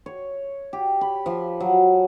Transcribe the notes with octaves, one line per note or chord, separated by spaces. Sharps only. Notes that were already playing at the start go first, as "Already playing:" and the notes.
C#5
G4
B5
F3
F#3